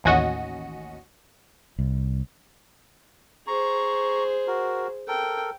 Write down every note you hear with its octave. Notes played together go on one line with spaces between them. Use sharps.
A1 D#2 C#4 F#4 D#5
C2
G#4 C5 A#5 C#6
F#4 A#4
A4 A#4 G5